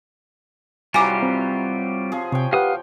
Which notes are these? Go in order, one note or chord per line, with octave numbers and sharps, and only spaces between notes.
C3 E3 F#3 G3 F4 G4 G#5 D6
C4
F3 G#4
C3 C#5 G5
G4 B4 F5 F#5 D#6